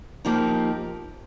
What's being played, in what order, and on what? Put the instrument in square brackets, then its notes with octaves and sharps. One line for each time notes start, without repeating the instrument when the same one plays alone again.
[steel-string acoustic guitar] F3 A#3 D#4 G4